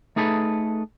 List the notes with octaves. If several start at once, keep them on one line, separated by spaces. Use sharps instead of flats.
A3 D#4 G#4 A4 B4